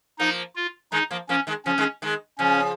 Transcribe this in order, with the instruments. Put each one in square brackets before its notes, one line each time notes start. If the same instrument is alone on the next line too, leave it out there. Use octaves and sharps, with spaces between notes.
[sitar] F3 A#3 [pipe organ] D#4
[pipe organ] F4
[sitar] D#3 G#3 [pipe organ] D#4
[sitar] F3 A#3
[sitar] F3 A#3 [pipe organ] C#4
[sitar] D#3 G#3
[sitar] C#3 F3 [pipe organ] C#4
[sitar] D#3 G#3
D#3 G#3
[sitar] C#3 F3 [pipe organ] C#4